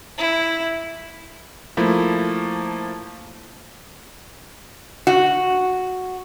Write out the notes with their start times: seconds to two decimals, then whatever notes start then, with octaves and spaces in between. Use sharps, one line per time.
0.18 E4
1.77 F3 A3 A#3 E4
5.07 F#4